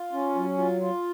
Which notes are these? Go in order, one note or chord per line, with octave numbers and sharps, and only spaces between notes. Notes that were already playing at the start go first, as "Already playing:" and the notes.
Already playing: F4
C#4
F#3
F4
F4